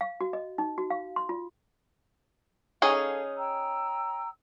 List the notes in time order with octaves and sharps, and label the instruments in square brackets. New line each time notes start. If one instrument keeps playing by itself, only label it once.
[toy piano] F5
F#4
D#5
D#4
F#4
F5
C6
F4
[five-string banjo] C#4 D#4 G#4 [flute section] A4 F5
[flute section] G5 A#5 E6